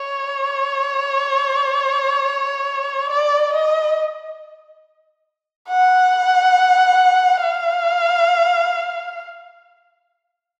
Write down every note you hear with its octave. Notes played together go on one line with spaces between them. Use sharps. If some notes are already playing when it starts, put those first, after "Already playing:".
Already playing: C#5
D5
D#5
F#5
F5